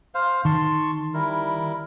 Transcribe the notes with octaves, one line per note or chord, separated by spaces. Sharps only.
C5 F5
D#3 A5 C6 C#6
G3 E4 A#4